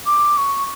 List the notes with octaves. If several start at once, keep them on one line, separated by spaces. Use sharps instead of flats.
D6
C#6